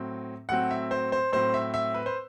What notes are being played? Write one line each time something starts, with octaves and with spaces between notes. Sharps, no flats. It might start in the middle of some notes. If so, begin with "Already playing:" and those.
Already playing: A2 F#3 C4
A2 F#3 C4 F#5
E5
C5
C5
A2 F#3 C4 C5
E5
E5
B4
C5